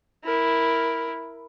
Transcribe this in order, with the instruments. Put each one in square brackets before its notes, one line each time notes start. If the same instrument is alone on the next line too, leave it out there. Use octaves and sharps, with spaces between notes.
[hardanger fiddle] E4 A#4